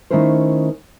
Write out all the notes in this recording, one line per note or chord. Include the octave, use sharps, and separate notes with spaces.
D#3 A3 C#4 E4 A#4 C5